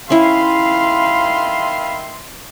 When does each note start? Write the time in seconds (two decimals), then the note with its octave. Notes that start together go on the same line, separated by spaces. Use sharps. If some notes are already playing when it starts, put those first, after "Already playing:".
0.10 D#3 C#4 E4 E5 F5 B5 C6